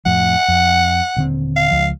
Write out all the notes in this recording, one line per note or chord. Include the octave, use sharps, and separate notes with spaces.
F2 A2 F3 F#5
F2
D#1 D3 C4
F5
C#2 F3